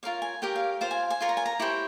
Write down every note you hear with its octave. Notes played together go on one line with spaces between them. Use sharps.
F4 A#4 C#5 F5
G#5
G4 A#4 C#5 G5
F5
F4 C5 F5
G#5
G#5
F4 A#4 C#5 C6
A#5
G#5
A#5
E4 G4 C5 C#6